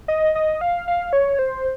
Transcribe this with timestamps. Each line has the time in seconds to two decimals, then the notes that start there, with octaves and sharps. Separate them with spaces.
0.08 D#5
0.35 D#5
0.61 F5
0.88 F5
1.13 C#5
1.39 C5